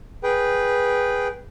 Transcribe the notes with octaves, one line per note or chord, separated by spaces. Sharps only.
G#4 B4 G5